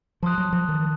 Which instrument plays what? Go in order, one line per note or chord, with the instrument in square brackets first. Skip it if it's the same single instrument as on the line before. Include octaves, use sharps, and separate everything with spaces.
[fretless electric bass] F3 [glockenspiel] A5 C6 D#6 F#6
[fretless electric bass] F#3
F3
D#3